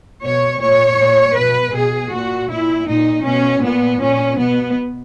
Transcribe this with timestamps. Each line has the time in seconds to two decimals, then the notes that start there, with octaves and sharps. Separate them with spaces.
0.23 B2 C#5
0.61 A#2 C#5
0.99 A#2
1.36 B2 B4
1.74 B2 G#4
2.12 A#2 F#4
2.50 A#2 E4
2.88 A#2 D#4
3.25 B2 C#4
3.63 A#2 B3
4.01 A#2 C#4
4.38 B2 B3